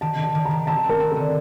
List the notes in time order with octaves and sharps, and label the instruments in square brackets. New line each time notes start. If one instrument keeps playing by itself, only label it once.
[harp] D#3 [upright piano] A5
[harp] D#3
[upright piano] A5
[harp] D#3
[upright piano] A#5
[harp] D#3
[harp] C4 [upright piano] A5
[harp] C4
[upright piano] A#4
[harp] C4
[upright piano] A4
[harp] D3